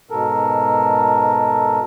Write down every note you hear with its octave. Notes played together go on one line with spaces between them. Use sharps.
G#2 B2 A4 A#4